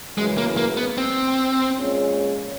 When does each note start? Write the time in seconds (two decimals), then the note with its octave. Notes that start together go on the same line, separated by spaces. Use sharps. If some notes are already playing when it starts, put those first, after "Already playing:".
0.17 F#2 C#3 E3 G#3
0.38 A#3
0.57 A#3
0.77 B3
0.98 C4
1.77 A#2 F3 G#3 C#4